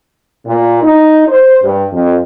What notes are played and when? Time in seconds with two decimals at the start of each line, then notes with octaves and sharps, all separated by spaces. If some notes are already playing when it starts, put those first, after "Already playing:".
0.47 A#2
0.83 D#4
1.29 C5
1.64 G2
1.93 F2